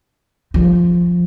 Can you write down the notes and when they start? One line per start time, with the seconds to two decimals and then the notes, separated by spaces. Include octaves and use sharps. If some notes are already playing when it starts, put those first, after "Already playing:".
0.54 F3